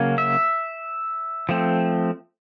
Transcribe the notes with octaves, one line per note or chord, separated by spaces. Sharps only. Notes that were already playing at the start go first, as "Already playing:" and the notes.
Already playing: C#3 F#3 A#3 C#4
E5
F3 A3 C4